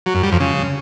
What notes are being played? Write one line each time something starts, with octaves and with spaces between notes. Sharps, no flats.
F#3
F#2
G3
F2
C#3